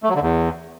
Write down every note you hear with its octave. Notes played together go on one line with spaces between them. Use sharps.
A3
F#3
D3
E2